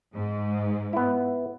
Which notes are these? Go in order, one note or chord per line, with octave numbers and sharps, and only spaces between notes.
G#2
B3 E4